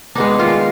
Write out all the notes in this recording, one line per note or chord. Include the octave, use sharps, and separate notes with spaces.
G#3 B3 D4 D#4
D#3 F4